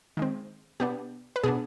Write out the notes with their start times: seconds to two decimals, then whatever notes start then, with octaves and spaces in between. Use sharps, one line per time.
0.17 D#3 G#3 C4
0.80 B2 B3 D4 G4
1.36 B4
1.43 B2 B3 D4 G#4